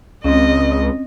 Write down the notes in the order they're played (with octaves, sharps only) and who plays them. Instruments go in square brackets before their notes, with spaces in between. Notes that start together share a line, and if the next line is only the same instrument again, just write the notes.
[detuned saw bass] C#2 [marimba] C4 C#4 [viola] D#5